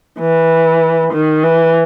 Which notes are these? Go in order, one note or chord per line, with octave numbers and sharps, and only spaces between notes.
E3
D#3
E3